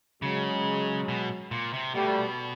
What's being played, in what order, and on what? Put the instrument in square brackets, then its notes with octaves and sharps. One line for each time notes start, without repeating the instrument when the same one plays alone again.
[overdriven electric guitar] C#3 [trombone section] F#3 G#3
[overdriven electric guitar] B2
A#2
C3
[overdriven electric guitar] B2 [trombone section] G3 A3